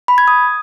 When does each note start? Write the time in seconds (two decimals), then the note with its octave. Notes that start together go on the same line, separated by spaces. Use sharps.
0.08 B5
0.18 G#6
0.28 D#6